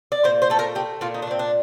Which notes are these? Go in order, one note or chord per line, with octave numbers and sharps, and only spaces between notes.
D5
A#2 C5
C5
A3 A4
A#4
A3 G4
A#2 F4
D#4
D4
A3
C4
D4